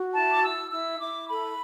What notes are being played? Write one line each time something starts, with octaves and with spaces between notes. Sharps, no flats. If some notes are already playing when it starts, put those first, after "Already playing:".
Already playing: F#4
E4 A5
D6
E4 E6
E4 E6
E4 D6
A4 B5